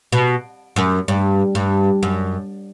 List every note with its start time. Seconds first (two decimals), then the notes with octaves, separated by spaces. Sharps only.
0.12 B2
0.76 F#2
1.08 G2
1.55 G2
2.03 F#2